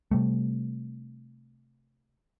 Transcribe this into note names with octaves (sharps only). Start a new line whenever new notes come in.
C3 G3 A3